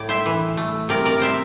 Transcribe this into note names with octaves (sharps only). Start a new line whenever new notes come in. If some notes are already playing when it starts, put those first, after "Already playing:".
Already playing: A2 D5
C5 E5
E3
A3
C3 A#4 D5
A#4 D5
C3 C5 E5